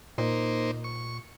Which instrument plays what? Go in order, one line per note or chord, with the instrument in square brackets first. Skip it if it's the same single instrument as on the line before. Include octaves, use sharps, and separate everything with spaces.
[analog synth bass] A#2 [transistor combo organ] A#3 D#4 C5
[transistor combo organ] C#6